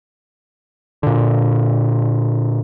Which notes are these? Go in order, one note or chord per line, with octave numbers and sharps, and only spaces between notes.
A#2 D3